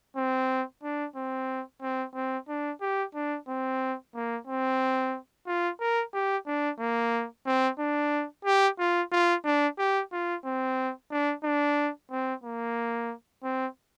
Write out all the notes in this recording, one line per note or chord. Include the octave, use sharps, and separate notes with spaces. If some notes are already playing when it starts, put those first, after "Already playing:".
C4
D4
C4
C4
C4
D4
G4
D4
C4
A#3
C4
F4
A#4
G4
D4
A#3
C4
D4
G4
F4
F4
D4
G4
F4
C4
D4
D4
C4
A#3
C4